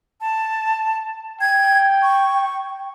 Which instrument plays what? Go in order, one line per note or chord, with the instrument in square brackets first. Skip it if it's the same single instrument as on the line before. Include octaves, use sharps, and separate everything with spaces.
[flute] A5
[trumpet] G5 [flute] G#6
[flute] C#6